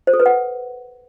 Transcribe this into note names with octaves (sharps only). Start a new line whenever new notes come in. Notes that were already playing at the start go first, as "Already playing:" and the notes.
C5
A4
B4
F#5